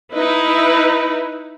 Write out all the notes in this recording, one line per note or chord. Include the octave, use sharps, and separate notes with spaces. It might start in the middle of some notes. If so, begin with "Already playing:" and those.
D#4 E4 B4